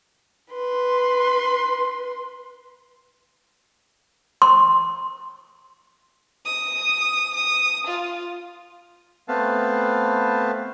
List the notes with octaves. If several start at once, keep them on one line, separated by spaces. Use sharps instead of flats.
B4 C6
C6
D#6
D#6
F4
A3 B3 C4 B4 F5 A5